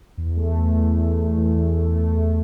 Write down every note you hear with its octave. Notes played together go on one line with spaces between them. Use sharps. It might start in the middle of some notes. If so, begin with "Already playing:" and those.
E2
A3
E2
E2
E2
A3
E2
E2
A3
A3
E2